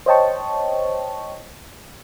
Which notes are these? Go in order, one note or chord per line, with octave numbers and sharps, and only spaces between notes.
C5 C#5 D#5 G5 A5 C#6